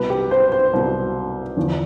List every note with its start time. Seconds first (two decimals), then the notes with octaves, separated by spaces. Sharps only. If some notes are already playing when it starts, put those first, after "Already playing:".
Already playing: C2 B2 B4
0.10 G4
0.31 C5
0.52 C5
0.73 C2 B2
1.57 E2 D3 F3